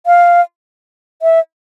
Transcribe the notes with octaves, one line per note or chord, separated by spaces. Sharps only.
F5
E5